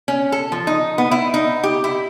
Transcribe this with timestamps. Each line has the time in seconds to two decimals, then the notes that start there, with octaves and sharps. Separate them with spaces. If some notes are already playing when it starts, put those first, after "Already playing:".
0.08 C#4
0.32 A4
0.52 F3
0.67 D#4
0.98 B3
1.11 E4
1.34 D#4
1.63 G4
1.84 E4